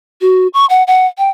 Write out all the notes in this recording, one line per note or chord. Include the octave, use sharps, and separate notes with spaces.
F#4
C#6
F#5
F#5
G5